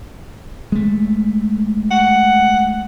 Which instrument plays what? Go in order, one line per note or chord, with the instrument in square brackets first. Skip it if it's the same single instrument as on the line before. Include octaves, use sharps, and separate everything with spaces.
[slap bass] G#3 A3
[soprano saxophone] F#5